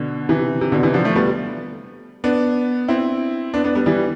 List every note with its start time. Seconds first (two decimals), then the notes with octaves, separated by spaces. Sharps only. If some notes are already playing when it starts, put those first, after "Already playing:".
Already playing: B2 D3
0.29 C3 E3
0.61 C3
0.72 B2 D3
0.83 C3 E3
0.94 D3 F3
1.04 F3 A3
1.15 G3 B3
2.24 B3 D4
2.88 C4 E4
3.54 B3 D4
3.64 B3 D4
3.75 G3 B3
3.86 E3 G3